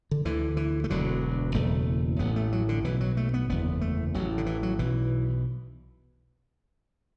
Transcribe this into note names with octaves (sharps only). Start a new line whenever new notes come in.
D3
D2 D3 E3
E3
A3
E1 D2 D3 F#3
F#1 E2 B2 A3
A1 A2 B3
A3
F#3
D3
B1 B2 E3
F#3
A3
B3
F#1 E2 D3 B3
A3
A1 A2 F#3
D3
E3
F#3
B1 B2 E3